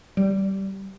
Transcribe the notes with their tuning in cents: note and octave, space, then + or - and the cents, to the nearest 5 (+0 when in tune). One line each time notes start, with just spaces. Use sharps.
G3 -20